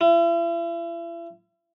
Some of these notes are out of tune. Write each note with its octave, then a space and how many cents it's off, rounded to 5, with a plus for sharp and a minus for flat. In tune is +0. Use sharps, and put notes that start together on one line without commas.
E4 +40